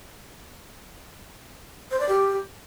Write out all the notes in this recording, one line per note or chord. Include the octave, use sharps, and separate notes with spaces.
C5
D5
G4